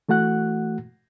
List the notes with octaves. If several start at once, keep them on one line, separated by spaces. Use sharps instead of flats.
E3 A3 F#4 F#5 F#6